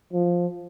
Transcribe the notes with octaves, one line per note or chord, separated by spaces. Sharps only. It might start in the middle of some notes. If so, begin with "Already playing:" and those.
F3